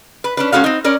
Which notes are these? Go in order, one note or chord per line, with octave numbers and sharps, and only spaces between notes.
B4
C#4 D4 B4
G#3 C#4 F#4 A4 F5
C4 D#4
C#4 A#4 D5